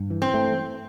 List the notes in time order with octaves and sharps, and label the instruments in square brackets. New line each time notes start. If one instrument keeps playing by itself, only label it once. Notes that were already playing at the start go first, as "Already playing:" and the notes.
Already playing: [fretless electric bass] G2
E3
[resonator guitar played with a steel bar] C4
[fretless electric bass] A3